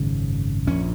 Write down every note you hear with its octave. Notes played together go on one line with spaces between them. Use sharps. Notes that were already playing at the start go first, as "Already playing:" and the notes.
Already playing: G#1 F#2 C#3
A#1 A#2 C#4